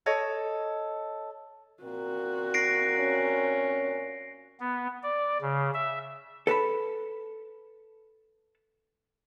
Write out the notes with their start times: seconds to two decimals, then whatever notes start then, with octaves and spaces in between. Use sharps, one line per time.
0.06 A4 C#5 D#5
1.83 A#2 C4 F#4 A#4
2.54 A#6 C7 D7
2.97 C#4
4.60 B3
5.03 D5
5.42 C#3
5.74 E5
6.47 A4 B4 A5 B5